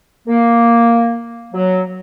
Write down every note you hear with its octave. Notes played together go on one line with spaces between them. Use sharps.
A#3
F#3